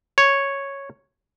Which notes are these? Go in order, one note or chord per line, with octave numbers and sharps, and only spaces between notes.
C#5